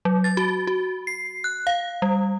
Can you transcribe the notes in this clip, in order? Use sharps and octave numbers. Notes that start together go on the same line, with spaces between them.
F#3
A6
F#4
F#4
C7
F#6
F5
G3